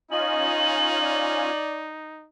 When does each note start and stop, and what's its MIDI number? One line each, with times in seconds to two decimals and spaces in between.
0.11 1.50 61
0.11 2.28 63
0.11 1.50 65
0.11 0.69 75
0.11 1.50 80
0.11 1.62 102
1.00 1.91 74